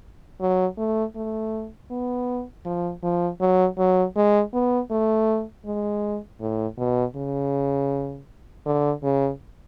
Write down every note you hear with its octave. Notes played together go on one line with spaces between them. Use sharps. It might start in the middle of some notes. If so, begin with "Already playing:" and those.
F#3
A3
A3
B3
F3
F3
F#3
F#3
G#3
B3
A3
G#3
A2
B2
C#3
D3
C#3